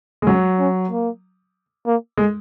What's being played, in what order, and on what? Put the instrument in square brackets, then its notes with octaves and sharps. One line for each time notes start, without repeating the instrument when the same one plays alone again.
[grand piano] G#3
[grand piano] F#3 [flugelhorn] C#4
[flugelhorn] C#4
A#3
A#3
[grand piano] G#3